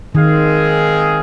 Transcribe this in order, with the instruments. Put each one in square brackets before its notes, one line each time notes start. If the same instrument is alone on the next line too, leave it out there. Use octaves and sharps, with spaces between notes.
[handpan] D#3 [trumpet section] G#3 C4 G#4 F5